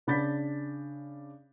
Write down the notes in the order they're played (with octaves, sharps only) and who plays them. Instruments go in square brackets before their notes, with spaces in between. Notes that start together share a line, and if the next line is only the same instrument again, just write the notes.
[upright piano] C#3 D4 B5 G6 A6 B6